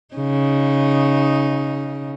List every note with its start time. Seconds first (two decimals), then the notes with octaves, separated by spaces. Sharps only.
0.15 C#3 D#4